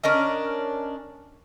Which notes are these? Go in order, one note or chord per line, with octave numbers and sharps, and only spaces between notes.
C#4 D4 A#4 D#5